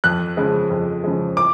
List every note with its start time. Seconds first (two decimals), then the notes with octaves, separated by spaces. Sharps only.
0.04 F2 F#6
0.37 C#3 F3 G#3
0.70 F2
1.04 C#3 F3 G#3
1.37 D6